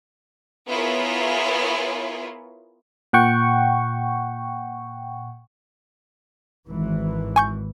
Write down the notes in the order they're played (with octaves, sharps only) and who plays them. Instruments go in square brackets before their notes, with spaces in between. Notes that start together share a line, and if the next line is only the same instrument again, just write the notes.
[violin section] B3 E4 F4 G#4 A#4 C#5
[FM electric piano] A#2 F#5 G5 C#6
[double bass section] G#1 E3
[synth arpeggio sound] G#5 C#6 G6